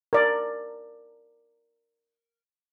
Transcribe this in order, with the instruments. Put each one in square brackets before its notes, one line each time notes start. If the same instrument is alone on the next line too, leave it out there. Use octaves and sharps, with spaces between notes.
[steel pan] A#4 D5